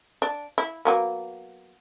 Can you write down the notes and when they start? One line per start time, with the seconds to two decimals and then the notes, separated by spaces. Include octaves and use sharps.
0.22 D4
0.58 E4
0.85 F#3 A#3 B3